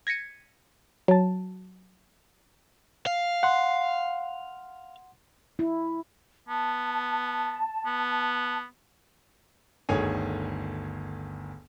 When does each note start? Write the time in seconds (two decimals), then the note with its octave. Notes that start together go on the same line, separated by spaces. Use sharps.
0.07 G#6 A#6 B6 C#7 D#7
1.08 F#3 A5
3.06 F5
3.43 F#5 C6
5.59 E4
6.49 B3 A5
7.86 B3
9.89 G1 D2 D#3 G#4 C#5 G#5